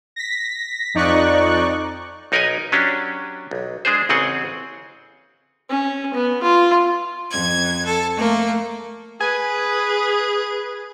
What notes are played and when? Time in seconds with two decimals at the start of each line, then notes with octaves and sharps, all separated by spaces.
0.16 A#6 B6
0.94 F2 D#4 D5 C#6 F#6
2.32 B1 D#4 A#4 B4 D#5 G#5
2.72 F#3 C#4 D4 G4
3.51 B1
3.85 G#3 D4 G#4 C5
4.09 A1 C#3 C4 G#4 F#5
5.69 C#4
6.14 B3
6.43 F4
7.31 F2 G#6
7.86 A4
8.16 A3 A#3
9.21 G#4 B4 G#5